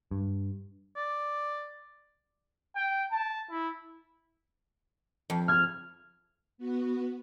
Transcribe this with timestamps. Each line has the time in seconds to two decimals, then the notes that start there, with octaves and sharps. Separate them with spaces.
0.11 G2
0.96 D5
2.75 G5
3.12 A5
3.50 E4
5.30 F2
5.48 F6 G#6
6.58 B3 F#4